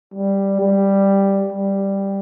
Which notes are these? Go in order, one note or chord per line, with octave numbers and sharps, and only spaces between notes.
G3
G3
G3